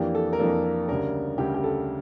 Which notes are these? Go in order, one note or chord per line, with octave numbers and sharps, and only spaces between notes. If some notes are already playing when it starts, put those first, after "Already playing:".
Already playing: F2 E3 A#3 D4 G4
A4
A#4
F2 E3 A#3 D4 A4
A#4
D2 C#3 G3 D4 A#4
D2 C#3 G3 D4 G4
G4
A4